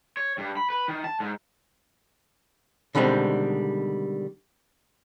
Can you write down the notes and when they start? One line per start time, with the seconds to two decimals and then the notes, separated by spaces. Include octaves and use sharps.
0.17 C#5
0.38 G2
0.57 B5
0.70 B4
0.88 D#3
1.04 A5
1.20 G#2
2.95 B2 D3 D#3 G3 G#3 C4